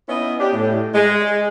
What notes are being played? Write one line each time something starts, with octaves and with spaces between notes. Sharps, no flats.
B3 C#4 D#4 E4 D#5
D4 G4
A2
G#3